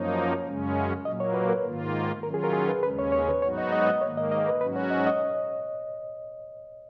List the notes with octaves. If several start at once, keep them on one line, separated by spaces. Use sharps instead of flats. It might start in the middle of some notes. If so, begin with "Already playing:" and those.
Already playing: F#2 F3 A#3 D#4 C#5
F#2 C#3 G#3 C#4
A#2 F#3 A#3 D#5
C#5
B4
A#4
G#2 D#3 A#3 F4
D#3 F#3 C#4 F4 A#4
G#4
A#4
G#4
B4
D#2 C#3 G#3 C#4 B4
C#5
C#5
B4
G#2 F#3 B3 D#4 F#4 C#5
D#5
D#5
D#5
G#2 D#3 A#3 C#5
D#5
D#5
B4
G#2 F#3 C#4 F#4 B4
C#5
D#5
D#5